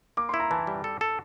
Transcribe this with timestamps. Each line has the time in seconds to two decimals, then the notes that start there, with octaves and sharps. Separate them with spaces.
0.17 A#3 D6
0.29 C6
0.34 E4
0.40 A#5
0.51 E3 A5
0.67 G3
0.84 A4
1.01 A4